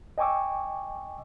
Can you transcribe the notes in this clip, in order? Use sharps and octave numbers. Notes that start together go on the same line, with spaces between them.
D#5 G5 G#5 C#6 D6 E6